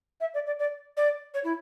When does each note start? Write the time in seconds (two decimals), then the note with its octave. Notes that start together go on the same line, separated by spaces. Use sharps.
0.20 E5
0.34 D5
0.46 D5
0.59 D5
0.97 D5
1.34 C#5
1.44 E4